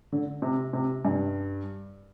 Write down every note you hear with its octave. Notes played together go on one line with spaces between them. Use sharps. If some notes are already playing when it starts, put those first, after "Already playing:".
D3
C3
C3
G2